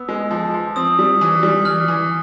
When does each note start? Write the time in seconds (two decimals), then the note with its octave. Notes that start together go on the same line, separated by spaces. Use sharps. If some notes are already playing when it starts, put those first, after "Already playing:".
Already playing: B3 E6
0.09 G#3
0.31 F3
0.54 F3
0.76 C4 D#6
0.99 G3
1.21 E3
1.43 G3
1.65 E3 F6
1.88 E3